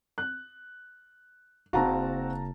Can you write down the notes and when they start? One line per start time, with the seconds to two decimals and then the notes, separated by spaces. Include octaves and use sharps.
0.18 F#6
1.73 F#1 C4 F#4 F5 A5 A#5